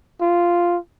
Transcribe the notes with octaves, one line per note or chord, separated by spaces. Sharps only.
F4